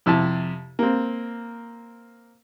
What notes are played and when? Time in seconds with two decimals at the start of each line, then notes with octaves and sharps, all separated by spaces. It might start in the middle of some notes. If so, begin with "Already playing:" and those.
0.06 F2 C3 E4 G4 A5
0.79 A#3 C4